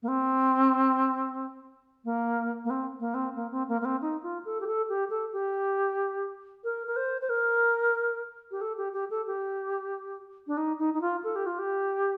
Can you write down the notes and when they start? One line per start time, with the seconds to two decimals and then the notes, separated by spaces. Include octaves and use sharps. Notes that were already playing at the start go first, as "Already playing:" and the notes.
0.03 A#3
0.08 C4
2.05 A#3
2.65 A#3
2.70 C4
3.00 A#3
3.14 C4
3.36 A#3
3.52 C4
3.69 A#3
3.81 A#3
3.85 C4
4.02 D#4
4.23 F4
4.45 A4
4.61 G4
4.67 A4
4.89 G4
5.10 A4
5.33 G4
6.64 A#4
6.87 A#4
6.96 C5
7.21 C5
7.29 A#4
8.51 G4
8.61 A4
8.77 G4
8.93 G4
9.10 A4
9.27 G4
10.47 D4
10.57 D#4
10.79 D#4
10.94 D#4
11.01 F4
11.24 A4
11.36 G4
11.46 F4
11.59 G4